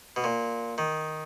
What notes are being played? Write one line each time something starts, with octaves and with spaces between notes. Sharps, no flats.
B2
A#2
D#3